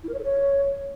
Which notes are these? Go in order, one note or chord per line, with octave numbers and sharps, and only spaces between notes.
E4
A#4
C#5
A4
C#5